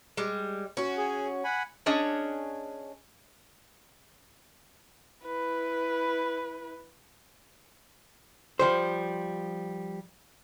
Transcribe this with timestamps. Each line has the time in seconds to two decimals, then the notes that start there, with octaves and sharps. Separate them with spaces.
0.17 G3 G#3
0.77 C#4 F#4
0.97 G#4
1.44 F#5 G#5 B5
1.86 C#4 D4 G#4 C#5 D#5
5.26 E4 B4
8.59 F3 G3 C5